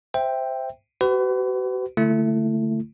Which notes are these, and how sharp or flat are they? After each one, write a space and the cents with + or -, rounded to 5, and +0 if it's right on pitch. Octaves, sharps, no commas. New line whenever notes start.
C5 -5 E5 +0 G5 +5
F#4 +40 B4 +35
D3 -15 A3 +10 E4 +30